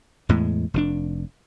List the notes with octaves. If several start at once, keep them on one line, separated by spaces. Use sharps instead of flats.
E2 A2 G#3
F1 B2 D4